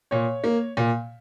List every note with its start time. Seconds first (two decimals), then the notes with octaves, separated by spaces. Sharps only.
0.11 A#2 C#5
0.44 A#3
0.77 A#2